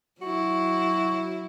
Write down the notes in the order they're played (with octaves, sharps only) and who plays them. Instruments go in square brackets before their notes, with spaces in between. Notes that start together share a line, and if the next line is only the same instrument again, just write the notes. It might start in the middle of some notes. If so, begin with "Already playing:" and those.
[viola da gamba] F#3 E4 [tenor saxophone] F#4